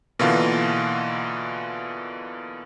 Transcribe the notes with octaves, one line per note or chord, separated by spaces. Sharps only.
B2 D3 E3 A#3 F4